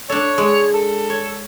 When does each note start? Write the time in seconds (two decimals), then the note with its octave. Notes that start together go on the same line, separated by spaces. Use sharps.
0.09 D4 A4 C#5
0.38 G#3
0.74 A4
1.10 C#5